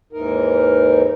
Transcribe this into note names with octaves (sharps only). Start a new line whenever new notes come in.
D#2 G#2 E3 D#4 A#4